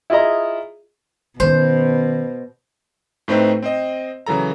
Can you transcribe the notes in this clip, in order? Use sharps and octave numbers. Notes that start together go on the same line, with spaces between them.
E4 F4 G#4 D#5 A#5
B2 D#3 C#4 C5
A2 A3 C4 D#4 B4 C5
C4 C5 D#5
C#3 E3 F#3 A4 A#5